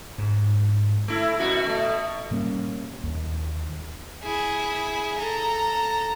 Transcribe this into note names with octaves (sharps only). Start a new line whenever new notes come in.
G#2
A3 E4
F#2 B2 F#4
B2 A3
A#2 G3 A#3 C#4
D#2
E4 G#4
A4 A#5